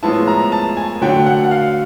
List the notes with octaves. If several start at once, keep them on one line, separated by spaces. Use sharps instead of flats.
A2 F3 G#3 B3 E4 A5
A#5
A5
G#5
D3 F#3 A3 G5
F#5
F#5
F5